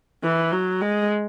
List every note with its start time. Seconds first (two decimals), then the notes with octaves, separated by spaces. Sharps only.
0.24 E3
0.52 F#3
0.81 G#3